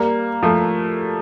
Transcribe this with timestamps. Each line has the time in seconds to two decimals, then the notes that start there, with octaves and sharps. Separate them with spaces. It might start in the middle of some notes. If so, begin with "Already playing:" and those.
Already playing: G3 A#3
0.43 F3 A3